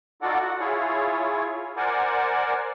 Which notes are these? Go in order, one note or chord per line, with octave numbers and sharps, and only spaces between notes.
D#4 F4 F#4 A4 D5 F#5
F#4 F#5
E4 F4 G#4 C#5
A#4 C5 D5 F#5 G#5